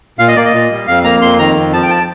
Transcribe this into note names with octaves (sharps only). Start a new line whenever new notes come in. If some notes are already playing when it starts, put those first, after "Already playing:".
A#2 F5
D#5
A#3 D5
D#5
A#2
G3
F2 F5
A#3 A#5
F2 C6
D#3 A#5
F2
F3 A5
G5
A5